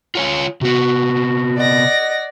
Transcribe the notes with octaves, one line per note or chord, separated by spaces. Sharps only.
F4 C#5 G#5
C3 B3 F#4
D5 D#5 F#5 A#6